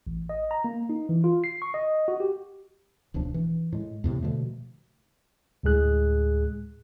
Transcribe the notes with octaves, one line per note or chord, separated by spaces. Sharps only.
A1
D#5
A#5
A#3
D#4
E3
F4
C7
C#6
D#5
F#4
G4
D1 B1 F3 D4
E3
A2 G#3
E2 A2 C3
B2 D3 F3 A3
D2 A2 G#3 G#4 F#6